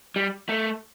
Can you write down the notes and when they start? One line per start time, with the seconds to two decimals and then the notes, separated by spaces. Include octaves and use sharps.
0.16 G3
0.49 A3